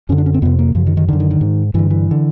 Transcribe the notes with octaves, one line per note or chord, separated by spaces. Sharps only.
F#2 D3 C#4
D4
C#4
C4
F2 C3 B3
A#3
F#2 C#3 F3
D#3
D#3
F#2 D3 D#3
D#3
D#3
G#2
G2 D3 E3
E3
D3